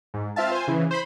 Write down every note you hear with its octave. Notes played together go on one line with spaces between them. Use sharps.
G#2
C4 F4 E5 F5 A5
C5 G#5
C#3 E3
C5 B5